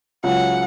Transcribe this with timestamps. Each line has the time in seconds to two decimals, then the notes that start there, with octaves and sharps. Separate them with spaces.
0.24 C#2 C#3 F#3 F#5